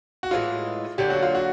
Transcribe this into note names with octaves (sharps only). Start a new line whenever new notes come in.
F#4
A2 E3 G#3 F4
D3 F#3 A#3 D4 G4
F#4
F4
F#4